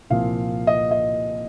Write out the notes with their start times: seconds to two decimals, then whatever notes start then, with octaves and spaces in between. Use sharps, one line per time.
0.10 C2 A#2 F3 F5
0.67 D#5
0.91 D#5